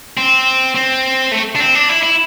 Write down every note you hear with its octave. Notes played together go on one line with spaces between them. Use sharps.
C4
C4
A3
D4
C4
D4
E4
E4